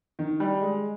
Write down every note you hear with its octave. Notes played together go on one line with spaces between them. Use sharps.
D#3
G3
G#3